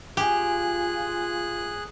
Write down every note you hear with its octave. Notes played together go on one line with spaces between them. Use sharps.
F4 G4 G#4 G5 G#5 F#6